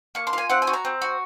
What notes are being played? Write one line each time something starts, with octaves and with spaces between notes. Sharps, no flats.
A#3 C#6
C6
F4 G#5
C4 F#5
G#5
F#4
A#5
C4
F#4